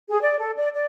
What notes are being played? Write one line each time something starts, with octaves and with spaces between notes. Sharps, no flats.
G#4
D5
A4
D5
D5